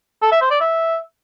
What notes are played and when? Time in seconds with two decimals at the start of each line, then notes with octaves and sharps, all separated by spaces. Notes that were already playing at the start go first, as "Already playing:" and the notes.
0.22 A4
0.32 E5
0.41 C5
0.51 D5
0.61 E5